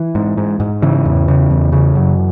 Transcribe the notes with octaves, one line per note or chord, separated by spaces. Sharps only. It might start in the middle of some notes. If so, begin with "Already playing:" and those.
Already playing: E3
G#2
G#2
G#2
C#3 E3
E2
C#3
E2
C#3
F#2